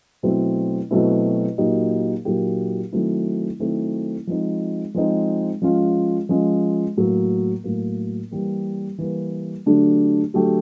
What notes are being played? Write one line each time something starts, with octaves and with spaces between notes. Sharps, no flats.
B2 F#3 A3 C4 E4
B2 F#3 A3 C4 E4
A#2 F#3 A#3 D#4 G4
A#2 F#3 A#3 D#4 G4
D#3 F#3 A3 C4 E4
D#3 F#3 A3 C4 E4
F3 G#3 C4 D#4
F3 G#3 C4 D#4
F3 G#3 C#4 F4
F3 G#3 C#4 F4
A2 F#3 A#3
A2 F#3 A#3
E3 G3 A#3
E3 G3 A#3
D3 F#3 A3 D4 G4
D3 F#3 A3 D4 G4